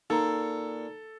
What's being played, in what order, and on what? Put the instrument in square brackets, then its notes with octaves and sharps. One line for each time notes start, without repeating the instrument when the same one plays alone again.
[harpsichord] A#2 [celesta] D#4 A#5 [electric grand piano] A4